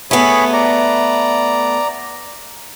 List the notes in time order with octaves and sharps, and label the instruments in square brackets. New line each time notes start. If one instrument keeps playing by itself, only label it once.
[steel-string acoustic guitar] A3 B3 [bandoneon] G#4 C#5 B5
[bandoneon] D5 A#5